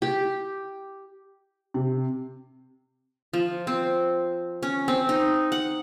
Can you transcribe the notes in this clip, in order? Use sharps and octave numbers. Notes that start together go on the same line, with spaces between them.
G4
C3
F3
C4
C#4
C4
D#4
F#5